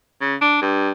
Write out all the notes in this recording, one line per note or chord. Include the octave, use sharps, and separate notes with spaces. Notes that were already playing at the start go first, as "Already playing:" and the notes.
C#3
D4
G2